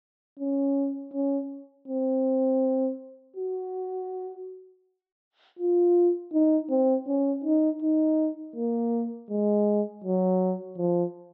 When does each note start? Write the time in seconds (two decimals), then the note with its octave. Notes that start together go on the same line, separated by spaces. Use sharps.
0.39 C#4
1.13 C#4
1.88 C4
3.36 F#4
5.59 F4
6.33 D#4
6.70 C4
7.07 C#4
7.44 D#4
7.82 D#4
8.56 A#3
9.30 G#3
10.04 F#3
10.78 F3